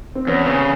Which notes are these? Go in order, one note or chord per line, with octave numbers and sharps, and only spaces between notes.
C4
E2 B3 C#4
C#3